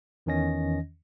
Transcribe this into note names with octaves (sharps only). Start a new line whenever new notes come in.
E2 D#3 E3 C#4 D#5 A#6